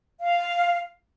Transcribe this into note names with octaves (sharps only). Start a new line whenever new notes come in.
F5